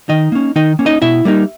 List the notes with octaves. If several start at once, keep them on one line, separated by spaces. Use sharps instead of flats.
D#3 D#4 D#5
A#3 C#4
D#3 D#4 D#5
A#3 C#4
D#4 D#5
B2 E4 E5
G3 A#3 D#4